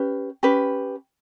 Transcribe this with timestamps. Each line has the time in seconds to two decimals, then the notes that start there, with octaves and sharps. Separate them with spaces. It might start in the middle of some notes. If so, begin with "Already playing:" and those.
Already playing: C#4 G4 B4
0.43 C#4 G4 B4